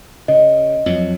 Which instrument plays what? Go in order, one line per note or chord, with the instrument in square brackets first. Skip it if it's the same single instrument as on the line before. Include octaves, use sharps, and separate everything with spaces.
[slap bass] C#3 [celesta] D#5
[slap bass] F2 F#3